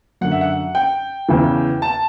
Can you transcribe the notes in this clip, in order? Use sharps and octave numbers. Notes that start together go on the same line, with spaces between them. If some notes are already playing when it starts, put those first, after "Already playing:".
F#2 D3 F#5
E5
F#5
G5
E2 C#3 E3
A5